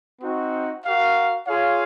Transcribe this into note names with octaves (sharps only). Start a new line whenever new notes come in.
C4 D#4 F#4
F#4 A#4 F5
F4 G#4 C#5 F5